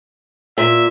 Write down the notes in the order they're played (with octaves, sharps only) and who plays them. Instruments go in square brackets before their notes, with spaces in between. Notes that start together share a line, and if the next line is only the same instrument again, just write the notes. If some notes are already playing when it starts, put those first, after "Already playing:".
[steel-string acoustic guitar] A#2 [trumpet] E5